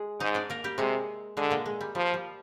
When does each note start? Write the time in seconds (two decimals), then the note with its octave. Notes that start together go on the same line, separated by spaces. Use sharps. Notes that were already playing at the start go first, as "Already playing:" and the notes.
Already playing: G#3 G#4
0.20 G#2 D#4 D#5
0.35 D4 D5
0.50 A#3 A#4
0.64 G3 G4
0.78 C3 G#3 G#4
1.37 D3 G#3 G#4
1.51 A#2 A#3
1.66 G#3
1.81 G3
1.95 F3 G3
2.14 G3